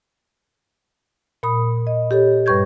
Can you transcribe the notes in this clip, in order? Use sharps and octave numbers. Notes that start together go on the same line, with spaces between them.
A#2 B5 D#6
D#5
G4 A4 C#5
G2 G3 B4 C#6 G6 G#6